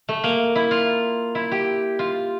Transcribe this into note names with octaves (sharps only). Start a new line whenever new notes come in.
A3
A#3
E4
F4
E4
G4
F4